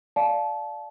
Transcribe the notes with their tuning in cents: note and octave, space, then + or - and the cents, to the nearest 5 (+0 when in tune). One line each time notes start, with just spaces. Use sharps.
D5 +0 F5 +0 A5 -20